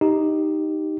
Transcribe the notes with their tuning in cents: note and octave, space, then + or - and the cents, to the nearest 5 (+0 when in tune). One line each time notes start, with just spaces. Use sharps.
D#4 +0 G4 +0